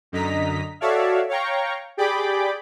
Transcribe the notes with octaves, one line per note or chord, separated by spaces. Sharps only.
F#2 D3 D#5 A#5 B6
F#4 A4 C#5 D5 E5 F5
C#5 F5 G5 A#5 C#6
G4 G#4 D5 G5 B5 D6